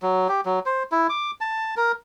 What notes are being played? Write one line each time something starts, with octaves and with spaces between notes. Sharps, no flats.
F#3
G4
F#3
C5
E4
D6
A5
A#4